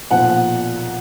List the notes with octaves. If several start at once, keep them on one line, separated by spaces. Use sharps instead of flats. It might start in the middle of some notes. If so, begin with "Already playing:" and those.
B1 A#2 F3 F#5